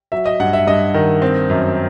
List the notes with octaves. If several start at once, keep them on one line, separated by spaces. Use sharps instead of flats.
F#3 E5
D#5
G2 F#5
E5
G2 D#5
D#3
C4
F#2